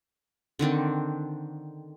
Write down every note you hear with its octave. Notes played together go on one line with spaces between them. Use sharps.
D3 D#3 C4 D4